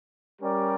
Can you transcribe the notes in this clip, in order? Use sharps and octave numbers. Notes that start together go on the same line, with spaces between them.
G3 C#4 G4 A#4 D5